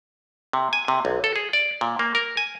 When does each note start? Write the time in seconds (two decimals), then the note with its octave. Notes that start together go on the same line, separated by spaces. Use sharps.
0.53 C3
0.73 G#5
0.88 C3
1.05 B1
1.24 A4
1.36 G#4
1.53 D5
1.81 A#2
1.99 A#3
2.15 A#4
2.37 G#5